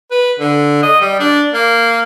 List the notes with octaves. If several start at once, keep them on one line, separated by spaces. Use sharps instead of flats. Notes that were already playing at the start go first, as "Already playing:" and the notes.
B4
D3
D#5
G3
D4
A#3